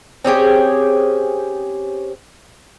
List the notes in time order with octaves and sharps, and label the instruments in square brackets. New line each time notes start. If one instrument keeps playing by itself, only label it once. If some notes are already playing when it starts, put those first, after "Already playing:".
[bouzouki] C4 C#4 G4 G#4